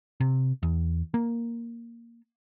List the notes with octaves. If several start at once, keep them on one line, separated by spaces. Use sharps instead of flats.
C3
E2
A#3